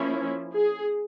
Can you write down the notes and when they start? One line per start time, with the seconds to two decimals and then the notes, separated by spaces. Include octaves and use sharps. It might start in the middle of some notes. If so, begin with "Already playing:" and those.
Already playing: F3 A#3 C#4 E4
0.55 G#4